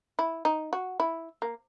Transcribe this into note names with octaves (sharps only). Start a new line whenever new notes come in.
E4
D#4
F#4
E4
A#3